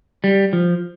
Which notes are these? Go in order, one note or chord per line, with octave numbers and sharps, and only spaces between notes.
G3
F3